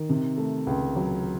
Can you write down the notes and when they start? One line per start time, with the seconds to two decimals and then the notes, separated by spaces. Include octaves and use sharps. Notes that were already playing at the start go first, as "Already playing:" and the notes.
Already playing: D#3
0.10 C3
0.38 A3
0.67 C#2
0.96 F#3